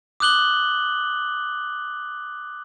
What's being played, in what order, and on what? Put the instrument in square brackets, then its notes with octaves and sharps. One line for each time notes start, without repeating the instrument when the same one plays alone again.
[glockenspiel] D6 D#6 F#6 F#7 G7